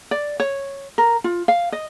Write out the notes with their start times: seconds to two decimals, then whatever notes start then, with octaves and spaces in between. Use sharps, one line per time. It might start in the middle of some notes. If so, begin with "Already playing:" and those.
0.11 D5
0.40 C#5
0.98 A#4
1.24 F4
1.48 F5
1.72 D#5